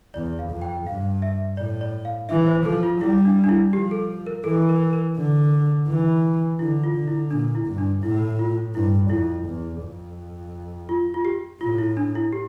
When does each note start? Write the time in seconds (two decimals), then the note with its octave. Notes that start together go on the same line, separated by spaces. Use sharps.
0.14 E2 D5
0.39 F5
0.51 F2
0.62 G5
0.87 G2 F5
1.22 E5
1.57 A2 D5
1.81 D5
2.05 F5
2.29 E3 E5
2.47 C5
2.65 F3 A4
2.83 F4
3.00 G3 E4
3.25 D4
3.44 D4
3.49 E4
3.72 F3 G4
3.91 A4
4.27 A#4
4.44 E3 A4
4.69 A#4
4.93 A#4
5.17 D3
5.87 E3
6.59 D3 E4
6.84 F4
6.95 D3
7.07 E4
7.31 A#2 D4
7.55 E4
7.67 G2
7.78 D4
8.03 A2 E4
8.39 F4
8.74 G2 E4
9.10 F2 E4
9.46 E2
9.83 F2
10.89 F4
11.14 F4
11.25 G4
11.61 A2 F4
11.78 E4
11.97 D4
12.15 E4
12.33 G4